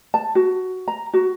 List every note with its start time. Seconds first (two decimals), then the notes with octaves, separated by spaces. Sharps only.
0.14 A5
0.35 F#4
0.88 A#5
1.14 F#4